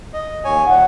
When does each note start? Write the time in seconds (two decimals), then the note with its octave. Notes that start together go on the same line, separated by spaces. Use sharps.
0.13 D#5
0.45 D#2 C#5 G#5
0.66 A#2 D#3 F#5